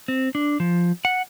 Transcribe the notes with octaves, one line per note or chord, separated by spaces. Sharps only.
C4
D4
F3
F#5